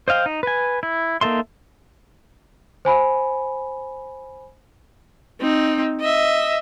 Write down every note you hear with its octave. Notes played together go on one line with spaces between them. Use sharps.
C5 D#5 F5 G5
D#4
B4 G#5
E4
A#3 D#4 A4 E5 C6
C5 G#5 B5
C4 D#4
D#5 E5